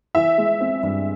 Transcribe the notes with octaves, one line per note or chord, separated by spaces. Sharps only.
E3 E5
G#3
C4
G2